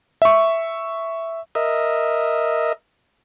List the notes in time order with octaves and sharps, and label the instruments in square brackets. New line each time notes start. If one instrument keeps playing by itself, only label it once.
[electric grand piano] E5 C#6
[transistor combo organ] A#4 D#5 E5